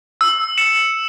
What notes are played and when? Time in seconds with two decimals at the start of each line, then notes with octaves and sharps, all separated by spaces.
0.21 E6
0.57 C#7 E7